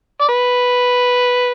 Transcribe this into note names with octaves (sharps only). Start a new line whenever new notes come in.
D5
B4